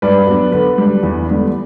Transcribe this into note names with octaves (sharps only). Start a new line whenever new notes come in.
G2 B4 D5
F#3 B3 D4
D3 B4
G3 D4
E2
D3 G3 B3 D4